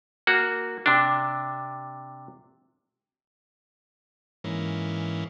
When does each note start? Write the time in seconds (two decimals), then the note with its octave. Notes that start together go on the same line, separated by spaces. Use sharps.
0.27 A#3 F#4
0.86 C3 D4
4.44 G#2 E3 A#3 C#4